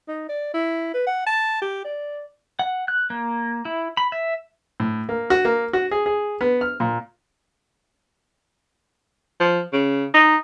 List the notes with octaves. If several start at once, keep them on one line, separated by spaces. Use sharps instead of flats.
D#4
D5
E4
B4
F#5
A5
G4
D5
F#5
F#6
A#3
E4
B5
E5
A2
A#3
F#4
A#3
F#4
G#4
G#4
B3
F6
A#2
F3
C#3
D#4